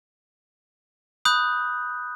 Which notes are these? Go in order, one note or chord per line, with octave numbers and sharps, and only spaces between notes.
B5 D#6 F#6 G6